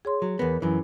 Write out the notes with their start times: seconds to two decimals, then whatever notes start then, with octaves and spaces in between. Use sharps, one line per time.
0.05 G#4 C#5 C6
0.22 F#3
0.39 E2 B3 A#4
0.62 F#2 E3